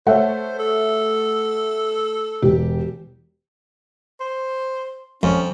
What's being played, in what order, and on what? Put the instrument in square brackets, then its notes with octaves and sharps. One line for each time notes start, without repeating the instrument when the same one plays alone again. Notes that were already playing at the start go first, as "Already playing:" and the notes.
[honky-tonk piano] A3 [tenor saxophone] C5 [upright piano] C#5 E5 F#5
[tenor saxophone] A4
[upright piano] E1 [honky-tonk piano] G4
[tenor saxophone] C5
[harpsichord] F2 [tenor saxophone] C#4